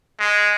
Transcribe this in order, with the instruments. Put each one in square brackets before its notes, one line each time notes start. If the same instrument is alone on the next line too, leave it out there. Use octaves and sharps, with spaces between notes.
[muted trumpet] G#3